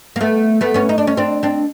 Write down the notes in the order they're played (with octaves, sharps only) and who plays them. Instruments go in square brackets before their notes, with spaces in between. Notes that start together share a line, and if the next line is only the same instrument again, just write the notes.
[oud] A#3
A3 B3
A3 B3
B3 C#4
D#4
D4
C#4
C4 D4
C4 D4